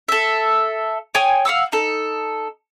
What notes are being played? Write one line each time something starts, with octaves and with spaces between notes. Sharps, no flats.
A4 E5
C#5 G5 G#5 D#6
F5 F#5 D6 E6
D#4 A4